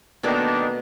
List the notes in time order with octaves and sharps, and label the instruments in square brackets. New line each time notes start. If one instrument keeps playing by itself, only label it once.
[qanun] B2 A3 A#3 [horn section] D#3 D4